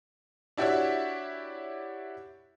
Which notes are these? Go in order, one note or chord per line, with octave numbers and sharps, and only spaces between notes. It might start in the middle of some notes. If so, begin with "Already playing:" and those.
D4 E4 F#4 G4 C#5 E5